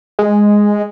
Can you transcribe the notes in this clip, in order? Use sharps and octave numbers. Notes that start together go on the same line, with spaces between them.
G#3